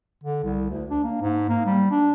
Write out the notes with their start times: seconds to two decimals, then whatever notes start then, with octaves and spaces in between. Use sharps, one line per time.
0.24 D3
0.43 C2
0.70 D2
0.90 D4
1.04 A#3
1.21 G#2
1.49 A#3
1.66 G3
1.91 D4